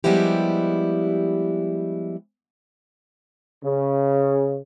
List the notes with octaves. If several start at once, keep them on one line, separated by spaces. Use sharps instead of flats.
F3 G3 G#3 B3 E4 G4
C#3